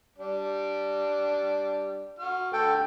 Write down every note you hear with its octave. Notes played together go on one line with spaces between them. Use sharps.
G3 D4 D5
F#4 F6
D3 A3 A4 G5